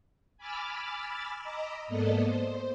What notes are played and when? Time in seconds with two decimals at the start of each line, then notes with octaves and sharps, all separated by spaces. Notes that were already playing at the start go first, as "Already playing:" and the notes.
0.37 G#5 B5 D6 E6 F6 A6
1.39 D#5 A#5 B5 D6 E6
1.87 G#2 A#3 B3 A4 D5 D#5
2.22 C5